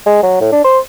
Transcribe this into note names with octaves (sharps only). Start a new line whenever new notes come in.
G#3
F#3
A2
D4
C5